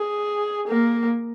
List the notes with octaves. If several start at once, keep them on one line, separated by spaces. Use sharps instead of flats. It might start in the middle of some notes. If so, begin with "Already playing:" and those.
Already playing: G#4
A#3